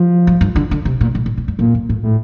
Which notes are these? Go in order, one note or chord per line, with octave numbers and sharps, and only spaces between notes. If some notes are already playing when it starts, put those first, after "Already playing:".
Already playing: F3
G2
G2
D3
D3
C3
A#2
A2
A#2
A#2
G2
F2 A#2
G2
A2
A2